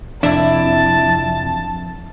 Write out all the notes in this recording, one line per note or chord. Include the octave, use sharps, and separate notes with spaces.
F2 C3 D4 E4 E5 A5